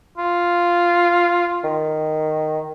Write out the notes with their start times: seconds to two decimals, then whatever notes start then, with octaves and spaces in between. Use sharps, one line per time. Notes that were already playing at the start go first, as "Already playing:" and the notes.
0.18 F4
1.64 D#3